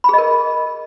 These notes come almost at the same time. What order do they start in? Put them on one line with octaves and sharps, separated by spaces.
B5 G#4 D#5 A#4